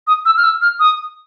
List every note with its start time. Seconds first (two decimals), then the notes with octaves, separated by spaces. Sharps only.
0.07 D#6
0.25 E6
0.37 F6
0.44 E6
0.62 F6
0.80 D#6